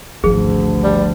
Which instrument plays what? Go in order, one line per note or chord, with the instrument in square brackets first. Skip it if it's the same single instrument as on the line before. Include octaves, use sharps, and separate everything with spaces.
[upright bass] G#1 F3 [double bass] D2 [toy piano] G#4
[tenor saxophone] G3